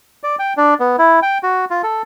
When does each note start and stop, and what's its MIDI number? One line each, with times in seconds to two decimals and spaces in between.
0.23 0.36 74
0.39 0.53 79
0.57 0.74 62
0.80 0.96 59
0.99 1.20 64
1.22 1.38 79
1.43 1.65 66
1.70 1.82 65
1.83 2.02 69